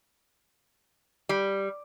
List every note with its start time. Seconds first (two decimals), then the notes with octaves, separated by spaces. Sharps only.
1.29 G3